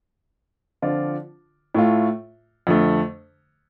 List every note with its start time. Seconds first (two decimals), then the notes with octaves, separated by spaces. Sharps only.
0.82 D3 F3 C4 F4 D5
1.74 A2 A3 F4
2.67 F2 D3 A3